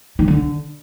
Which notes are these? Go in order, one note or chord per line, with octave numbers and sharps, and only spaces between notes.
D#3
D3